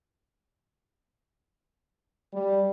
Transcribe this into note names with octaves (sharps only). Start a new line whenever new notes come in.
G3